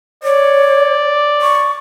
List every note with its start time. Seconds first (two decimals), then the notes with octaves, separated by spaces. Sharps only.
0.24 C#5 D5
1.42 C#6